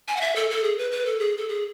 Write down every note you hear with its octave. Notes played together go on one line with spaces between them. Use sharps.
G#5
F#5
E5
A4
A4
G#4
B4
B4
A4
G#4
A4
G#4